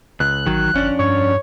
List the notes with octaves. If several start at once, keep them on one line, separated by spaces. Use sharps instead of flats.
C#2 F#6
A1 D#3 F#3
G1 F2 C#4 D4
G2 C#5